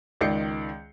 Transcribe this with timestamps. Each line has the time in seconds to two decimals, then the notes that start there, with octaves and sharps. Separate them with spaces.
0.21 C#2 D#3 D5 G6 C7 C#7